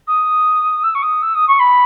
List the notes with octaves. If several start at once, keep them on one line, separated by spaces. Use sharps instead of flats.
D#6
E6
C#6
D#6
E6
D#6
C#6
B5